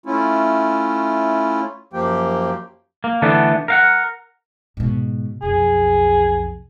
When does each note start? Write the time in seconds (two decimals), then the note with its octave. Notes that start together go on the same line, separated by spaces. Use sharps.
0.06 A3 C#4 E4 F4
1.93 F#2 F3 A#3 G4 G5
3.04 A#3
3.22 D3 E3 A3 B3 D4
3.68 A#4 F5 F#5
4.77 G#2 B2
5.42 B1 F2 G#4